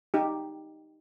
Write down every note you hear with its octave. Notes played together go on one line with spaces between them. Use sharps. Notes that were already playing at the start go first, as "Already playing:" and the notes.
D#4 G4